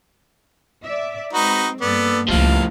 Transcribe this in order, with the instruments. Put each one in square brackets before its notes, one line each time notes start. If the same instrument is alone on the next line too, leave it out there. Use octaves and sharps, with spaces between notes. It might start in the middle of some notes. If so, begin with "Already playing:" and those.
[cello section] D5 E5
[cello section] G#3 C4 [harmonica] D#4 F#4 B4
[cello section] G2 A#3 [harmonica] B3 A4 D5
[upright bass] C#2 G3 [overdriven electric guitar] A2 F3 [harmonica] F5